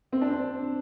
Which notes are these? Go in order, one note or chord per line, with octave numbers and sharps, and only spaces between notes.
C4
D4
C4